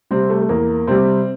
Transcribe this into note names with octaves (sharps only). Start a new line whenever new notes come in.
C3 G3 C4
A3
A3
E2 A#3
C3 G3 C4